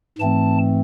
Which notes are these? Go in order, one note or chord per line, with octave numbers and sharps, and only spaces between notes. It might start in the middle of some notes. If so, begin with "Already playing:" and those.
G#2 E3 A3 C4 A5